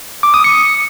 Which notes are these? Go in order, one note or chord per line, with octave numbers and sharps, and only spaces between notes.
D6
D#6
C#7